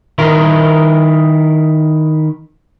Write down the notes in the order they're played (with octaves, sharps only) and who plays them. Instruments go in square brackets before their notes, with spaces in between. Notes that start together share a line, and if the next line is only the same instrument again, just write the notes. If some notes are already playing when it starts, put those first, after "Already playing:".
[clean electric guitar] D#3 E4 A#4